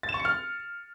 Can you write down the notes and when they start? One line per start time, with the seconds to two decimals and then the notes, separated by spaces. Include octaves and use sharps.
0.03 A6
0.09 E7
0.14 C#6
0.20 C#7
0.25 F6